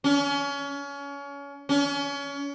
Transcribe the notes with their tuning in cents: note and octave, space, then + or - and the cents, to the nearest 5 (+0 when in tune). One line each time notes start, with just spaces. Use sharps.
C#4 +30
C#4 +30